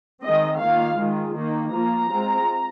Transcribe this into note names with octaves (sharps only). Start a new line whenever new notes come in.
D#3 G#3 C4 D#5
D#3 A#3 F4 F5
D#3 G#3 F4
D#3 A#3 D#4
F3 A#3 F4 A#5
G#3 C4 F4